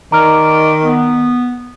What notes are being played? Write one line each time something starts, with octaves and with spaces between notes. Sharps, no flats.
D#3 D5 A#5 D6 F6
B3